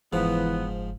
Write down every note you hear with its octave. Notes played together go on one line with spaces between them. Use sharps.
F#1 G#2 E3 F3 B3